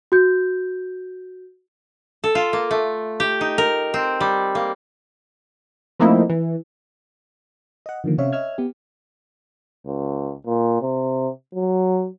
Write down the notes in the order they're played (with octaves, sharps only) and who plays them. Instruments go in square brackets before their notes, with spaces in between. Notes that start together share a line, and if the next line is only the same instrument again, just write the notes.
[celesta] F#4 G6
[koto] A4
F4
A#3
A3
G4
D#4
A#4
C4
G3
A#3
[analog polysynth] F3 A3 A#3 C4 D#4 E4
E3
[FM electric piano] D#5 F#5
D3 D#3 F3 A#3
C3 C4 C#4 C#5 E5 F5
C#5 D#5 E5 E6 F6 G#6
B3 G4
[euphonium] C#2
A#2
C3
F#3